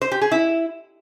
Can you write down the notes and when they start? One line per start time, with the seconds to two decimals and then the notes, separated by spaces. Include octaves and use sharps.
0.02 C5
0.12 G4
0.22 G#4
0.32 E4